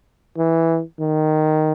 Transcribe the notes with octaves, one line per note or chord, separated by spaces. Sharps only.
E3
D#3